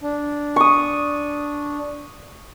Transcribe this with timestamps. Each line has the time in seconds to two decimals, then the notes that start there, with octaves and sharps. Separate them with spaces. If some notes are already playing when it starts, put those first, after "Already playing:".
0.01 D4
0.56 C#6 D#6